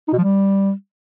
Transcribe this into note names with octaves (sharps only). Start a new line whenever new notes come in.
D#4
B2
F3
G3